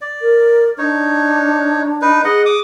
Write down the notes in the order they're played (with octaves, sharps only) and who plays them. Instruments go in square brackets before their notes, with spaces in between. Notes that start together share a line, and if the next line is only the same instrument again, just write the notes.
[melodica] D5
[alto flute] A#4
[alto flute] D4 [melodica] D#4 C#5
[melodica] D#4 B4
[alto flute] G#4 [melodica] D#5 F#5
[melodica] D6 D#6